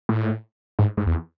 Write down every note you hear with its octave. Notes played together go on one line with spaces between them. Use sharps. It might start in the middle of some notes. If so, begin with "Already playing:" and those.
A2
G#2
G#2
E2